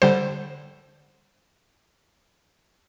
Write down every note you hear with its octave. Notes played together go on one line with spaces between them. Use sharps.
D3 G3 C5